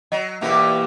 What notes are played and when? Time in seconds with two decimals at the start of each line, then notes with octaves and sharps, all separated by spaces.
0.12 F#3 D#5
0.41 E2 B2 E3 A#3 G4 E5